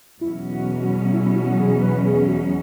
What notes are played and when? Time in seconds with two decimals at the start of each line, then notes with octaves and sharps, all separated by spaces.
0.21 E2 B2 F#3 C#4 E4
0.52 F#4
0.82 F#4
1.13 E4
1.36 F#4
1.60 G#4
1.82 B4
2.05 G#4
2.28 F#4